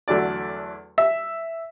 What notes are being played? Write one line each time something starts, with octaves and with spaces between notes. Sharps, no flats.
E2 D3 F#3 A3 D5
E5